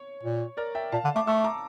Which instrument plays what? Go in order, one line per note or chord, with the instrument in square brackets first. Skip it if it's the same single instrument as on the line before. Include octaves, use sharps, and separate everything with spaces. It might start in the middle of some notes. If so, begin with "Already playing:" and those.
Already playing: [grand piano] C#5
[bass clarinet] A#2
[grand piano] A#4 D5
E5 G5
[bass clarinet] A#2 [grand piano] F5 A5
[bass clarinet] D3
[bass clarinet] A3 [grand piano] D6
[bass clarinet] A3 [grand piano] C#6 E6
[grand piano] A#5 D6